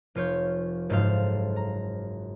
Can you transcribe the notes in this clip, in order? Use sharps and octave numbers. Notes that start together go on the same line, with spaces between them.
F1 F4 C#5 G6
F#1 G#2 F#4 A4 C5 F5
A#5